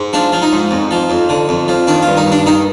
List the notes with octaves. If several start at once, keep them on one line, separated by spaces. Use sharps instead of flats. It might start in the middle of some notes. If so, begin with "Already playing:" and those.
Already playing: G#2
F3 D4
F3
D#4
G#2
F2
F3
F2
D3
F2
F3
D#3 D4
G2 F4
D#4
G2
D4
D#3 D#4